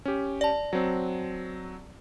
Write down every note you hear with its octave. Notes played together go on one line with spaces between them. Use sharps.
C#4 G4
D5 A5
F#3 C4